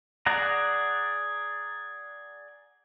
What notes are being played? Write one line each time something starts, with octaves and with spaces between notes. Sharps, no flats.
G#4 D5 F#5 A#5